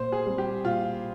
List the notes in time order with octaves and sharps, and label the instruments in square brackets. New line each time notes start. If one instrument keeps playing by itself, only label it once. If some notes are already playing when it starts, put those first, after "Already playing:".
Already playing: [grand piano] A#2 [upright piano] C5
[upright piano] G#4
[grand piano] G3 C4
[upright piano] G4
[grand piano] A#2 [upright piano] F4